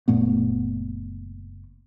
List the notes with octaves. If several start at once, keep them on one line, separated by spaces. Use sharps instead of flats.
F#1 A#2 A3 B3